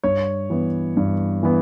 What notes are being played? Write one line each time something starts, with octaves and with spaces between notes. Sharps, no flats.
G2 C#5
E3 B3
G2
E3 B3